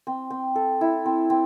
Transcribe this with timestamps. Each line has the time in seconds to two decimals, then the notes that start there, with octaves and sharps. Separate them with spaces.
0.07 C4
0.30 C4
0.55 A4
0.81 E4
1.06 C4
1.30 C4